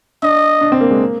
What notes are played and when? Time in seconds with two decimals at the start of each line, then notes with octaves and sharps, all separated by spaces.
0.23 D4 D#5
0.61 D4
0.72 C4
0.81 A#3
0.91 G#3
1.01 A#3